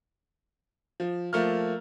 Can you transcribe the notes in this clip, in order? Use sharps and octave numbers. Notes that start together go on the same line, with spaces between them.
F3
F3 A3 A#3 F6